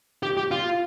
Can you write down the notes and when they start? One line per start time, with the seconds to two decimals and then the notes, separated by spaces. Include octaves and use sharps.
0.23 G4
0.37 G4
0.51 F4